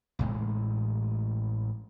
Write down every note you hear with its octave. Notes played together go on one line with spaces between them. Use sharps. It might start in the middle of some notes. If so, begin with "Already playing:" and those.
A1 A2 G#3